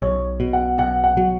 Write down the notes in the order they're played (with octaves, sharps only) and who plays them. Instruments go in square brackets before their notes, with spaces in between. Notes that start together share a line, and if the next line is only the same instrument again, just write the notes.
[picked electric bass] B1 [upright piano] C#5
[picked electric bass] B2
[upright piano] F#5
[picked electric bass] B1 [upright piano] F#5
[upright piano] F#5
[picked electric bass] F#3